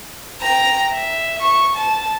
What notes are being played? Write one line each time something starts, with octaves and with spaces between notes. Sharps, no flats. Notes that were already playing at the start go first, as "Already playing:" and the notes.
G5 A#5
E5
C#6
A5